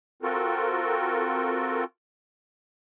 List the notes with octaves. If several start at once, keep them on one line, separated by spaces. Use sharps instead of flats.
C4 F4 F#4 A4 A#4